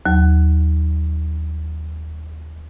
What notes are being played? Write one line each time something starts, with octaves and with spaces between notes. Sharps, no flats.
D#2 F#3